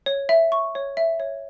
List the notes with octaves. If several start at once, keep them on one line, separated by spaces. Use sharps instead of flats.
C#5
E5
C#6
C#5
E5
C#5